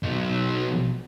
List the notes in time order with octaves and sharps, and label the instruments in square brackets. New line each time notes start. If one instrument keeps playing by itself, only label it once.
[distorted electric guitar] B1 D#4